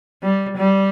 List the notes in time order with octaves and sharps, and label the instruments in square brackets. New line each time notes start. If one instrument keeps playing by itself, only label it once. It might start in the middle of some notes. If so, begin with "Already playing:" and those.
[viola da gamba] G3
G3